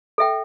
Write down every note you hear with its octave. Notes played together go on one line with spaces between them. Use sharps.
A4 E5 G5